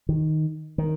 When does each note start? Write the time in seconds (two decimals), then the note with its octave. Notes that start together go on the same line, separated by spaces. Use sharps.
0.09 D#3
0.78 D#3